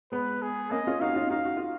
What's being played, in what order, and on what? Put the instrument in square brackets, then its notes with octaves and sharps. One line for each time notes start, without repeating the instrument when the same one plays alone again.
[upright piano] G#3 B3 [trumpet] B4
[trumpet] G#4
[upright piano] A#3 C#4 [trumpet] D#5
[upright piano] C#4 F4
[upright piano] D#4 F#4 [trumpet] F5
[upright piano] C#4 F4
[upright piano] D#4 F#4 [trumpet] F5
[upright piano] F#4
F4